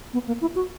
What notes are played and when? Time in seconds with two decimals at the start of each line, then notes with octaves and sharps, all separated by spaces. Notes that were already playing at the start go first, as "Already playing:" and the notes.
0.13 B3
0.27 A#3
0.41 E4
0.55 F#4